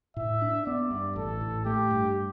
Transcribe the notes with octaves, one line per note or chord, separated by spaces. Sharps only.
A2 E5
D4
B3 D5
G2
A1 A4
A2
A3 G4
G2